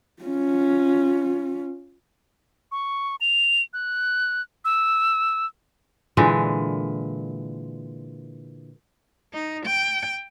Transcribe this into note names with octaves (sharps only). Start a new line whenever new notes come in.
C#4 F4
C#6
F7
F#6
E6
A#2 D3 E3 G#3
D#4
G5